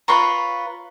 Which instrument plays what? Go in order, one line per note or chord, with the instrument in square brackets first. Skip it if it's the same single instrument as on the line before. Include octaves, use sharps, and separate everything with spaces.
[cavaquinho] F4 B4 C#5 A#5